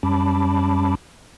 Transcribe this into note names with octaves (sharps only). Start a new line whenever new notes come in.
F#2 G3 C#4 A5 B5 D6